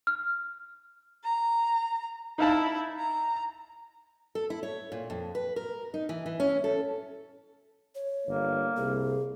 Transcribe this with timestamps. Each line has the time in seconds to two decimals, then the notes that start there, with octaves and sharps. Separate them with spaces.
0.07 F6
1.24 A#5
2.38 D#4 E4 F5 A5
2.98 A#5
4.35 A4
4.50 E4
4.63 C#5
4.92 A#2
5.10 F2
5.35 B4
5.56 A#4
5.94 D#4
6.09 E3
6.26 E3
6.40 C#4
6.64 A4
7.95 C#5
8.27 G1 A#3
8.77 C2 G#4